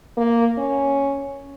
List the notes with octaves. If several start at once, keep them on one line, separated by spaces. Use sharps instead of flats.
A#3
C#4